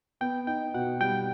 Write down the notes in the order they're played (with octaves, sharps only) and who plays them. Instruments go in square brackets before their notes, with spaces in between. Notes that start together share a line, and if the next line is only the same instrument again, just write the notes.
[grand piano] B3 [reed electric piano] G5
[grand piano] D#4 [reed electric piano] G5
[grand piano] B2 [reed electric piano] F#5
[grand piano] G3 [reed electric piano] G5